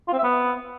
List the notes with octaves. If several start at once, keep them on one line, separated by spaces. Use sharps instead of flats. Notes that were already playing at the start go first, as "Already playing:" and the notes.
F4
C4
E5
B3